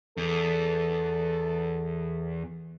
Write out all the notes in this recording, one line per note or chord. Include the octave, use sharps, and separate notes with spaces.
E2 A4